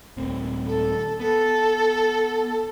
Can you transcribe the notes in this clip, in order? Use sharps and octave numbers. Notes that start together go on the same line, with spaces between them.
D#1 C4
A4
B3 A4